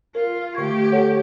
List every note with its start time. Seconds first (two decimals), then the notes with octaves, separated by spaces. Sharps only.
0.15 F4 A#4
0.55 D3 A3 G4 C#6 G#6
0.92 A4 C#5 F#5